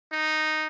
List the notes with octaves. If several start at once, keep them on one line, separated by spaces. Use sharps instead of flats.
D#4